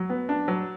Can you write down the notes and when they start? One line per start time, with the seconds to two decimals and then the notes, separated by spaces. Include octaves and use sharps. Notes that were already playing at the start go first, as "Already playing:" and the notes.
Already playing: F#3
0.10 B3
0.29 D4
0.48 F#3